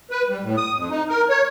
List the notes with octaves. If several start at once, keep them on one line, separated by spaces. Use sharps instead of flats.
B4
G3
A2
D#6
F2
D#4
A#4
C#5